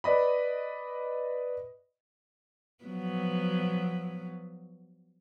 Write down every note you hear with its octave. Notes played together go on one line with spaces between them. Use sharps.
B4 D5 D#5 B5
F3 F#3 B3